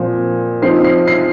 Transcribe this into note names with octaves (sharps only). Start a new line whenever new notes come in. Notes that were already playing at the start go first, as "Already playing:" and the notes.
Already playing: A#2 F3 C4
F3 C4 D#4 C7
C7
C7